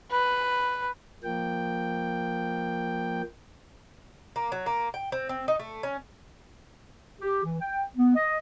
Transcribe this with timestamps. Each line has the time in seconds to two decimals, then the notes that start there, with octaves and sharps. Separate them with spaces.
0.12 B4
1.23 F3 A#3 G5
4.36 A#3
4.52 F#3
4.66 A#3
4.94 G5
5.12 C4
5.29 C4
5.48 D#4
5.60 A3
5.83 C#4
7.21 G4
7.44 E3
7.61 G5
7.97 B3
8.15 D#5